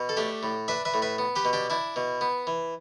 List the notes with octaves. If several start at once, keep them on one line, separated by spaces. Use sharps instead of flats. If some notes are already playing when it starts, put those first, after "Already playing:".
Already playing: B2
A4
A3 D4 G4
A2
D4 B4 E5
B4 E5
A2
B4 E5
B3
G4 B4
B2
D4 G4
D4 E4
B2
B3
E3